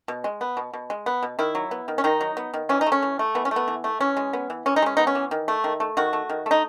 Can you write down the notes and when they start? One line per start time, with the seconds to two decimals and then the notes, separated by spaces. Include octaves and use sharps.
0.08 B2
0.24 G#3
0.41 B3
0.57 B2
0.74 B2
0.90 G#3
1.06 B3
1.23 B2
1.39 D#3 E4
1.55 F#3
1.71 B3
1.88 D#3
1.98 C#4
2.04 D#3 D#4
2.21 F#3
2.37 B3
2.54 D#3
2.69 E3 C#4
2.81 D#4
2.86 A3
2.92 C#4
3.02 E3
3.19 A3
3.35 E3 B3
3.45 C#4
3.51 A3
3.56 B3
3.68 E3
3.84 A3
4.00 E3 C#4
4.17 G#3
4.33 B3
4.50 E3
4.66 E3 C#4
4.76 D#4
4.82 G#3 C#4
4.97 B3 D#4
5.07 C#4
5.15 E3
5.31 D#3
5.48 A3
5.64 D#3
5.80 A3
5.97 D#3 F#4
6.13 A3
6.29 D#3
6.46 A3 D#4